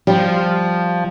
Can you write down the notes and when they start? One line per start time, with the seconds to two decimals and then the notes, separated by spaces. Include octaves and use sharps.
0.07 F3 G3